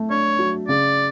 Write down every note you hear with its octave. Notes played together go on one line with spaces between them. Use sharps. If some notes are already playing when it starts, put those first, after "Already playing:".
Already playing: A3
D4 C#5
F#3
C#3 D5